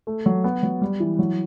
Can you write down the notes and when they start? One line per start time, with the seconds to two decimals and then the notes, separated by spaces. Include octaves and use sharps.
0.07 A3
0.26 F#3
0.44 B3
0.63 F#3
0.81 G3
1.00 E3
1.19 F#3